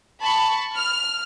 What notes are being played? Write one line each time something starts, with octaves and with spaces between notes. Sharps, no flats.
A5 B5 C#6
F6